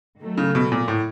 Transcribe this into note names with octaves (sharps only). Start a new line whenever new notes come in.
D#3 F#3 A3
C#3
B2
A#2
A2